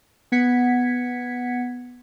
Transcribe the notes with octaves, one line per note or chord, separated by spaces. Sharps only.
B3 F#5 G#6 B6 C#7